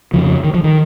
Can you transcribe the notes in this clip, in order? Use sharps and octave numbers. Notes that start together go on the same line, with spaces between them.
F2 C#3 F3
D#3
F3
D#3